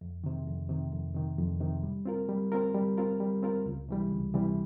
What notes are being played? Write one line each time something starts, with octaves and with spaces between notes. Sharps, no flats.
F2
C3 D#3
F2
C3 D#3
F2
C3 D#3
F2
C3 D#3
G3
C4 F4 A#4
G3
C4 F4 A#4
G3
C4 F4 A#4
G3
C4 F4 A#4
C#2
C3 E3 G3
C#2
C3 E3 G3